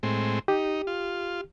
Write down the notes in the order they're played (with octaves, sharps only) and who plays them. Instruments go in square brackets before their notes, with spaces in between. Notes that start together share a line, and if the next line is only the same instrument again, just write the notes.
[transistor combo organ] A2 G#3 C4
[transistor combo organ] D#4 [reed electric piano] G4
[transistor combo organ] F4